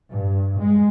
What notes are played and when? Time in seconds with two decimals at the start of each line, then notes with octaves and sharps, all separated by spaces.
0.11 G2
0.59 G#3